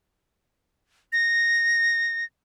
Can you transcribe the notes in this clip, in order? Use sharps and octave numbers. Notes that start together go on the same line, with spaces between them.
A#6